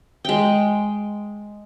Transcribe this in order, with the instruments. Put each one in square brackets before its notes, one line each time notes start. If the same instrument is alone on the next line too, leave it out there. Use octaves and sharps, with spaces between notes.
[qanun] G#3 G5